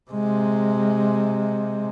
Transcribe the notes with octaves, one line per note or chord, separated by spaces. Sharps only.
C3 G#3